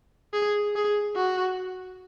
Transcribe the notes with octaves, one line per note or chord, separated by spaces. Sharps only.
G#4
G#4
F#4